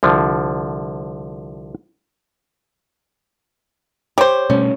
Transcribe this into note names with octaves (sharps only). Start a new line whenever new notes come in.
C2 D3 F3
G4 C5 C#5
B2 G3 A3 C#4